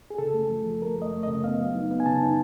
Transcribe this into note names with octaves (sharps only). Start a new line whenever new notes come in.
G#4
C#3 A4
A3
F3
F3
A3 A#4
A3
D#5
A3
C#3 D#5
B3 F5
F#3
D#4
B3
G#5
C#3 A5
D#4